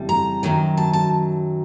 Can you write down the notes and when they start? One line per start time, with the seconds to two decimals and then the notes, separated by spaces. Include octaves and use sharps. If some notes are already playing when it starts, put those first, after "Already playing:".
Already playing: F2 C#3 E3 G3
0.09 A#5
0.43 F#2 D#3 F#3
0.77 A5
0.93 A5